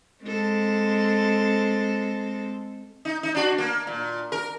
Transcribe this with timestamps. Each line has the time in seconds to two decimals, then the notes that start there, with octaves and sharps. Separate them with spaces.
0.24 G#3 C4 A4
3.05 D#4
3.23 D#4
3.35 D4 F#4
3.58 A#3
3.87 A#2
4.32 A#4